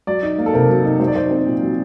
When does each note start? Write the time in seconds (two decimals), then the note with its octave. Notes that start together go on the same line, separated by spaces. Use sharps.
0.07 F#3 D5
0.23 D#4
0.38 A#3
0.46 A4
0.53 C3 A#4
0.69 F#3
0.85 D#4
1.00 F#3 C5
1.08 D5
1.15 D#4 C5
1.31 C4
1.47 A#2
1.62 F#3